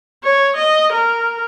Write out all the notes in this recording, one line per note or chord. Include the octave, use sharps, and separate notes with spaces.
C#5
D#5
A#4